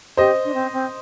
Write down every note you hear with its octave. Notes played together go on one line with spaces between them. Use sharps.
G4 C5 D#5
D4
C4
C4